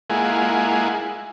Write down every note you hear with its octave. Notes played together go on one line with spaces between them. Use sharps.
G#3 A#3 E4 F4 F#5 G#5